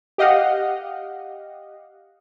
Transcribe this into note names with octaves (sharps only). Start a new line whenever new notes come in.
G4 D#5 F5 F#5